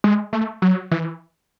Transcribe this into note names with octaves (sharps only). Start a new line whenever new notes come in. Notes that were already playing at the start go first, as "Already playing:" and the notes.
G#3
A3
F#3
E3